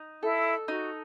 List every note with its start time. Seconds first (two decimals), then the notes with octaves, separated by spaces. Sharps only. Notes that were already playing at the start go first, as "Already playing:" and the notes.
Already playing: D#4
0.22 E4 A4
0.68 D#4 F#4